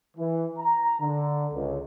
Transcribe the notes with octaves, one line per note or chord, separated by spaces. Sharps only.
E3
A#5
D3
C#2